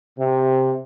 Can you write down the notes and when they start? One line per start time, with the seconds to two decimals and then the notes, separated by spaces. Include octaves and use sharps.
0.18 C3